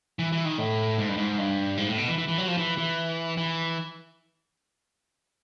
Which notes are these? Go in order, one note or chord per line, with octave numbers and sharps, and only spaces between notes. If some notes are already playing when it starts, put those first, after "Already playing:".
E3
E3
D#3
A2
G#2
G2
G#2
G2
G#2
A2
B2
E3
E3
E3
F#3
F3
E3
E3
E3